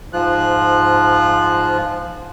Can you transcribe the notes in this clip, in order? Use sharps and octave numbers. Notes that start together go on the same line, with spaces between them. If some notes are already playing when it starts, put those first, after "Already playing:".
G#2 F3 F4 F#6